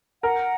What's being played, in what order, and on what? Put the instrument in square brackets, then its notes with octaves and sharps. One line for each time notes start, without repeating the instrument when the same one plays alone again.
[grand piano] A#4 [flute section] F#5